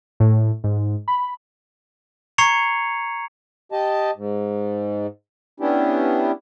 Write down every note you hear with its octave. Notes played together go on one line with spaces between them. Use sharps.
A2
G#2
B5
A#5 C#6 G#6 C7 C#7 F7
G4 D#5 A5
G#2
B3 C#4 D4 E4 G4